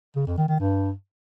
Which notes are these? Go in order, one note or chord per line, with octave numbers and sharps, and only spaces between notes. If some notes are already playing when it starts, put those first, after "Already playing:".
C#3
F2
D#3
D#3
G2